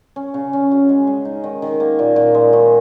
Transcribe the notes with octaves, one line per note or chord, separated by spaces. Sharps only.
C#4
C#3
C#4
F#4
G#3
G#3
D#4
D#3
D#3
A#3
A#2
A#2
G#3
D#3